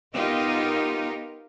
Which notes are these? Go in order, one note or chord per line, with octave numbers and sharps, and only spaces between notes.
B3 D#4 F4 G4 A#4 D#5